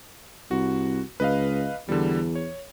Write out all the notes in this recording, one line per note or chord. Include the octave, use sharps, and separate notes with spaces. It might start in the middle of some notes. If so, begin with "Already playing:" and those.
C2 F#4
C#2 B4 D#5 F5
E2 D3 G3
C#5